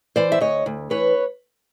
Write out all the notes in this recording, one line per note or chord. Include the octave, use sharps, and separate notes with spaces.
E3 C5 D5
E5
D2 C#5 D#5
D2
E3 B4 C#5